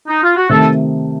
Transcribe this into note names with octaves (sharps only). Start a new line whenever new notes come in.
D#4
F4
F#4
C3 D#3 A3 A4